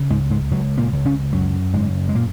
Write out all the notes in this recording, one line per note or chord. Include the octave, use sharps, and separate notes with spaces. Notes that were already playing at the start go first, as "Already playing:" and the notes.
Already playing: C#3
C#2 G#2 G#3
G#2 G#3
C#2 F#3
A#2 A#3
C#2
C#3 C#4
F#2 F#3
F#1 G#2 G#3
G#3
A#2 A#3